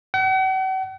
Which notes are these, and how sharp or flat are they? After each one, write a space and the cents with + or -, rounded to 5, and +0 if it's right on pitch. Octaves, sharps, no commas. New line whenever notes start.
F#5 +45